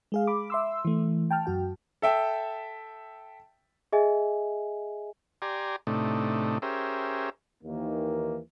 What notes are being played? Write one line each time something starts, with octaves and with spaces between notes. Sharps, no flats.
G#3 G#4 F5
B5 D6
E5 C6 E6
E3 A3
G5 A5 F6
F#2 F#4 G5
A4 E5 G5
G#4 D#5 E5 G#5
G4 D5 G#5 A#5 C6
A2 C3 A3 D4 D#4
C#4 G4 G#4 A#4 C5 E5
D#2 D#3 E3 A#3